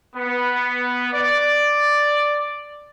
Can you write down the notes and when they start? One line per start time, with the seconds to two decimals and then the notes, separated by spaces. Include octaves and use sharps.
0.16 B3
1.14 D5